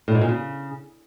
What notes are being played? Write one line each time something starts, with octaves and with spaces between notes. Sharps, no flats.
A2
G#2
A#2
C#3